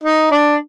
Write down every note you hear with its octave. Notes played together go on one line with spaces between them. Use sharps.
D#4
D4